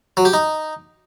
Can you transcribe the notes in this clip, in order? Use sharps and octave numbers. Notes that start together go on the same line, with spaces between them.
F#3
G4
D#4